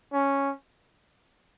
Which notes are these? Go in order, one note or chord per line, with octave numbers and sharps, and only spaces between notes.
C#4